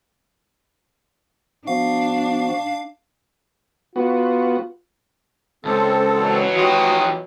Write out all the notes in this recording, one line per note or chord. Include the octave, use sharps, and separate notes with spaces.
F3 B3 D4 F#4 F5
B3 F4 F#4
C#2 C4 A4
B2 E3 F#3
F3 F#4 G4 D#6